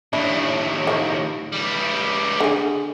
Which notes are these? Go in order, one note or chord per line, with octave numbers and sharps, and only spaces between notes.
D#2 A2 D4 E4
D#3 F3
C#2 G3
D3 G#4